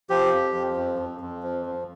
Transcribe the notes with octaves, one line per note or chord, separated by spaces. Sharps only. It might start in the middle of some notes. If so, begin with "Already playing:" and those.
F3 G4
F2
F3
F2
F2
F2
F3
F3